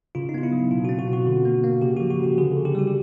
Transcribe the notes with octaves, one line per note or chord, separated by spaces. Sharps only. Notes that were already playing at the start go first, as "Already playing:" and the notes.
C#3 F4
D#4
B3 F4
E4
F#3
E4
B2 F4
C4 F#4
F#4
B2
F#4
D3
A#3
A#3
C#3 G4
F3 F#4
F#4
C#3 G4
D3 G#4
D3 A4
G4
G3 F#4
G4